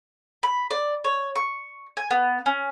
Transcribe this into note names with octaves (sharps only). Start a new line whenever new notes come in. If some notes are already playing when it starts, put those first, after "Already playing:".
B5
D5
C#5
C#6
G#5
B3
C#4